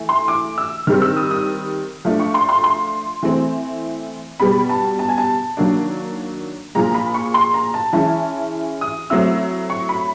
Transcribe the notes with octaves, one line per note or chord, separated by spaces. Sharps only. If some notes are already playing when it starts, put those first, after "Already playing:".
Already playing: E3 A3
C6
D6
E6
D#3 G3 C4 F6
E6
D#6
D#6
F3 A3 D4
C#6
C6
C6
C6
E3 A3 C4
B2 G3 B3 B5
A5
A5
G#5
A5
D#3 F#3 A#3 D4
A#2 F3 G#3 A#5
B5
C#6
C6
A#5
A5
E3 G#3 C#4 E4 A5
D#6
F#3 A3 C4 E4 E6
C#6
B5